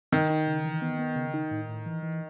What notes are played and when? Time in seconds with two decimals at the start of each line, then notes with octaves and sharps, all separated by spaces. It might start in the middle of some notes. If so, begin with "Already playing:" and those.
0.12 D#3 D#4
0.30 D#4
0.47 C#3
0.64 E3
0.82 B3
0.99 B3
1.16 C#3
1.34 D#4
1.51 A2
1.69 A2
1.86 E3
2.03 E3